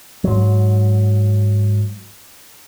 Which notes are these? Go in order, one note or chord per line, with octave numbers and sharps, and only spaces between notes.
G#2 F#3